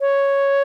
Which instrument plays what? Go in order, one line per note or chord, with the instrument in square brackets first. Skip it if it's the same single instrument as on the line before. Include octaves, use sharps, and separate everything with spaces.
[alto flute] C#5